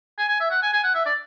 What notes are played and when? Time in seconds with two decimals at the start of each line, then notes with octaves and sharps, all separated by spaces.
0.18 G#5
0.28 G#5
0.40 E5
0.50 F#5
0.62 G#5
0.73 G#5
0.84 F#5
0.95 E5
1.06 D5